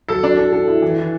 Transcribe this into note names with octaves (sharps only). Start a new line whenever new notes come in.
F#3 A4
F#3 D4
A4
A4
E4
E3
E3